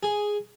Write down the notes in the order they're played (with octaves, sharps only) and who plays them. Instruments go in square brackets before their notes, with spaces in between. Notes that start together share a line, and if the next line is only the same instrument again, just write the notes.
[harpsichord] G#4